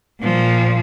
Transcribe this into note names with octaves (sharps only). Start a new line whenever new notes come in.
A#2 F3